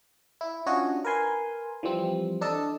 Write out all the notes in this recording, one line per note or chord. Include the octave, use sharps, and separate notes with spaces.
E4
C#4 D4 F4 F#4 C#5 D#5
A#4 B4 G#5 C6
E3 F3 G3 C4
D4 A4 D#5 A5